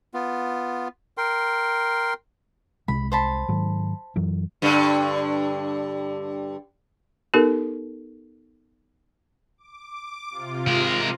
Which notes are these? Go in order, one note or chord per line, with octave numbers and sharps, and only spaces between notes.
B3 F4
A#4 G5 C6
C2 C3 G#3 B5
C5 A5 B5
G#2 D#3 F#3
F#2 E3 F#3
G2 D3
B3 D#4 G4 A4 A#4
D6
C3 F4
G#3 A#4